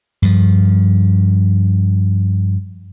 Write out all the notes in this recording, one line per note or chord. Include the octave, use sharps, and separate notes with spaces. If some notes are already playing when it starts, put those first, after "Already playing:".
G2 F3